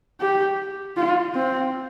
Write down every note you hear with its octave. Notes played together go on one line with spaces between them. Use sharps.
G4
F4
C4